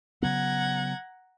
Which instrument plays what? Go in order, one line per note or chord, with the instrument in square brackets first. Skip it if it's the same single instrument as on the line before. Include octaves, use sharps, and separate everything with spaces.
[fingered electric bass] C#3 F#3 B3 [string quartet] F#5 A#5 G#6